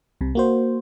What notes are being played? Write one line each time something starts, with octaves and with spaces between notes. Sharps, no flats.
C2 C3
A#3 F#4 C5